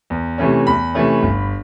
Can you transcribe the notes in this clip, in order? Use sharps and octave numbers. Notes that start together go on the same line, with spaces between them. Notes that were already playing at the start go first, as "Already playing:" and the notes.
E2
C3 E3 A3 C#4
E2 B5
C3 E3 A3 C#4
G1